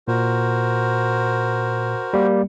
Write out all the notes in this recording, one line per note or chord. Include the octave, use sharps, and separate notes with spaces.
A#2 F#4 A#4 C5
G3 A#3